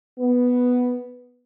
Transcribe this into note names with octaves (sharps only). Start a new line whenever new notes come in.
B3